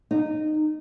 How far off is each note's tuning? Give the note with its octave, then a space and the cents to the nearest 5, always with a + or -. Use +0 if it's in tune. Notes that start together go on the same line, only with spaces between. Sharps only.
D#4 -20